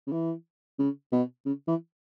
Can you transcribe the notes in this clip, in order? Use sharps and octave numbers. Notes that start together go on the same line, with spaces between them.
C#3
E3
C#3
B2
C#3
E3